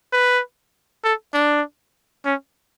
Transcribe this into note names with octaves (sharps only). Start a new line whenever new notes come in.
B4
A4
D4
C#4